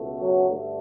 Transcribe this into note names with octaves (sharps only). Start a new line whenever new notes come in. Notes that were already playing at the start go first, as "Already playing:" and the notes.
Already playing: C#2 B2 A3
F#3 F#4
G2 D3 A3